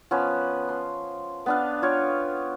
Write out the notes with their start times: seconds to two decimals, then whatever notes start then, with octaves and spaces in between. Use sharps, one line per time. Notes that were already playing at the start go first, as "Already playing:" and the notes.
0.11 F3 B3 C#4 B4
0.69 C6
1.46 B3 D4 F5
1.82 F4 C#5 F5 G5